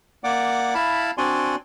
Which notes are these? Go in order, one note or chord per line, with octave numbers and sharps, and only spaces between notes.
A#3 D5 F#5 D6
E4 F5 A5 B5
C4 D4 F#4 D5 G#5 C6